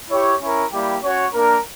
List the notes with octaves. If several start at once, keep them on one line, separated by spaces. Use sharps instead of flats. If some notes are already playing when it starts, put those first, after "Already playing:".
E4 G4 C#5
C#4 E4 A#4
G3 A#3 E4 G4
C#4 F#4 C#5
A#3 D4 A#4